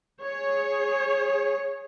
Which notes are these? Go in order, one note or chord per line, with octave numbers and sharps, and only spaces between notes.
G#4 C#5